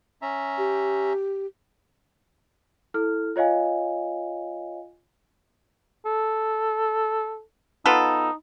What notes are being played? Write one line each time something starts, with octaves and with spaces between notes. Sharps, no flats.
C#4 E5 A#5
G4
E4 A4 F6
F4 C#5 D#5 F5 G#5
A4
B3 D#4 F4 A4